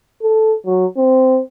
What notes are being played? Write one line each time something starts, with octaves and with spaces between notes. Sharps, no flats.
A4
F#3
C4